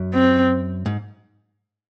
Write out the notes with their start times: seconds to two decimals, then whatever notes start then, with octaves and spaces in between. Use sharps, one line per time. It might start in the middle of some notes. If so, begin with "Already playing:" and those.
Already playing: F#2
0.14 C4
0.86 G#2